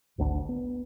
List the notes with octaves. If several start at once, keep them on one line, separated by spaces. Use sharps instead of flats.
G#1 D2 D4
B3